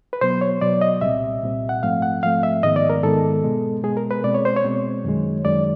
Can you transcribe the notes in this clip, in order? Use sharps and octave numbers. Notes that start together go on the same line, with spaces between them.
B4
B2 F#3 B3 C5
C#5
B2 F#3 B3 D5
D#5
C2 A#2 G3 C4 E5
C2 A#2 G3 C4
F#5
G#2 F3 A3 C4 F5
F#5
G#2 F3 A3 C4 F5
E5
G#2 D#3 G#3 B3 D#5
D5
A#4
G#2 D#3 G#3 B3 A4
B2 G#3 B3
B2 G#3 B3 G#4
A#4
B4
B2 G#3 C4 D5
C#5
C5
C#5
B2 G#3 C4
F#2 D#3 G#3
F#2 D#3 G#3 D5